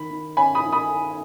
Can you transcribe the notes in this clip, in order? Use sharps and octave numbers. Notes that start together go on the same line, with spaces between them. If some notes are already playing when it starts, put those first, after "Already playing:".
Already playing: D#3 B5
D#3
C#4 G#5 B5
B5 D#6
D#3
B5 D#6